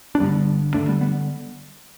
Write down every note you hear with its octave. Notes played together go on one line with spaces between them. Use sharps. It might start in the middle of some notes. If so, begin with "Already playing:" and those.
D4
G1 G2 D3 G3 B3
D2 D3 A3 D4
G3 B3
G3 B3